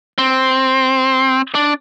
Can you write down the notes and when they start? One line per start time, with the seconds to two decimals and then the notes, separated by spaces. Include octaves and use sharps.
0.18 C4
1.55 D4